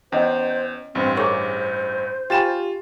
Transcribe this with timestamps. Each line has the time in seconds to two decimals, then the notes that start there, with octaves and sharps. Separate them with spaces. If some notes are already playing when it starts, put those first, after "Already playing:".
0.12 E2 C#4 C5 C#5 D#5
0.95 A1 G2 C4
1.17 D4 G#4 A#4 C5 C#5 A#5 C#6
2.30 F4 G4 G5 G#5 B5 A6 E7